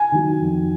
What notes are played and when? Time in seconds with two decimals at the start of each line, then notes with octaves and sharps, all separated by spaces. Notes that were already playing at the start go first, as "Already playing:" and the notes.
Already playing: G#5
0.12 D#3 F#3
0.39 F2